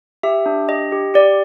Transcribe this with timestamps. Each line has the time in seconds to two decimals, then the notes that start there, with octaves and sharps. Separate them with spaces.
0.23 G4 E5
0.46 D4
0.69 G4 D#5
0.92 G4
1.14 G4 D5